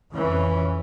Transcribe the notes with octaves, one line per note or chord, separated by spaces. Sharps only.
F2 E3 C#4